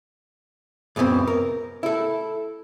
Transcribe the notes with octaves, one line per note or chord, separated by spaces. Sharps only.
C#2 F#2 A#2 B3 C4
A#4
E4 A4